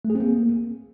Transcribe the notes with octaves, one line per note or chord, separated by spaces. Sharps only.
A3
G#4
C4
A#3